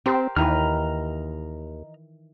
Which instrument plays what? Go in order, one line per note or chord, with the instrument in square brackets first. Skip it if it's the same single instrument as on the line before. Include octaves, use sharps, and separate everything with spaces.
[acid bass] C4 [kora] G4 A#4 C5
[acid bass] D#2 [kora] D#3 E3 B4 [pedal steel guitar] D#5 A#5 F6